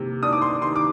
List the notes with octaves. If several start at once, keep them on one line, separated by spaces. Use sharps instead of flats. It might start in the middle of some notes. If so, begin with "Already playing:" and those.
Already playing: C3 A#3
D4 D#6
D6
C6
D#3 C6
D6